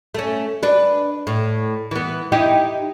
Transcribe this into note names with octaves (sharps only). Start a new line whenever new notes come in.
A3 C#4
D4 B4
A2
E3 B3
D#4 E4 G4